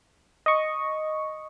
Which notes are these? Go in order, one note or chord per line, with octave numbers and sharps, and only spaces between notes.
D#5 C#6